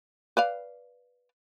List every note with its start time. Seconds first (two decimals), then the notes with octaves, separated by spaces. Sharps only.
0.37 B4 D5 F5